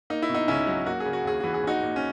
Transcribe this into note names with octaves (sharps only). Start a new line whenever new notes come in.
A#3 D#4
E4
B2
D#4
C#2 C#4 E4
F#3
A#3 F#4
G#4
C#3
F#4
D#2 G#4
E3 F#4
G#4
A#1 D#4 F#4
A#2
C#4